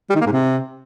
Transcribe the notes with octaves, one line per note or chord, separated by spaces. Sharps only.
G3
D#3
A#3
G#2
C3